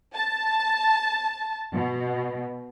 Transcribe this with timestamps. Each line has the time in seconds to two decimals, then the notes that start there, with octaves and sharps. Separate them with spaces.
0.13 A5
1.73 B2